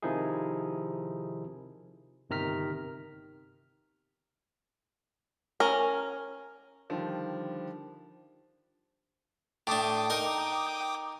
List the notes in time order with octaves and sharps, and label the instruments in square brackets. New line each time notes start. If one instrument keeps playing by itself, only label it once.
[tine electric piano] C3 D#3 F3 D#4 E4 G#4
G1 C3 D#3 A#5 F6 B6
[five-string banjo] C#4 A#4
[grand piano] D3 D#3 F3 G3
[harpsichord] A2 D4 [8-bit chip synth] G5 D6 D#6
[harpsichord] D#4 A#4